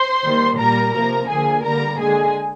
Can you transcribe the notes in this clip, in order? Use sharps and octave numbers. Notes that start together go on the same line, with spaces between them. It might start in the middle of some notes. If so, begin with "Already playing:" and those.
Already playing: C5 C6
D#3 G3 A#3
A#2 G3 A#3 A#4 A#5
C3 F3 A#3 A#4 A#5
D3 F3 A#3 G#4 G#5
D3 G3 A#3 A#4 A#5
D3 G#3 G#4 G#5